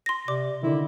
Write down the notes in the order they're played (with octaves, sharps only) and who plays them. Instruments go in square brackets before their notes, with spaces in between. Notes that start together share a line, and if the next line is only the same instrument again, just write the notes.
[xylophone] C6 A#6
[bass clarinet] C3 [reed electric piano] D5 [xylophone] D6
[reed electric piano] D3 D#3 [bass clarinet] E4